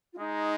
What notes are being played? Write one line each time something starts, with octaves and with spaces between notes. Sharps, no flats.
F4
G#3 D#4